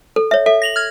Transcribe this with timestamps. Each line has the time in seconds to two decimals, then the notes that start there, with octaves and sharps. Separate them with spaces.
0.16 A4
0.31 C#5 E5
0.46 A4 E5
0.62 A#6 F7 F#7
0.76 F6 G#6